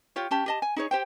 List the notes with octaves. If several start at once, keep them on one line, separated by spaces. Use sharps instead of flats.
F4 G4 C#5
C#4 G4 A5
G4 D#5 A5
G#5
D#4 G#4 C#5
G4 C5 G5